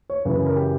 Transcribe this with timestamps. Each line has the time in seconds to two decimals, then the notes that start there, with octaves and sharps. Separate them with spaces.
0.10 C#5
0.25 F#2 C#3 E3 B4
0.36 B4
0.46 A#4
0.56 G4